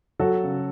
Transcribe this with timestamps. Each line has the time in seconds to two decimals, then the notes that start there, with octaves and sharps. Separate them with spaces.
0.20 F#3 F#4 A4
0.43 C#3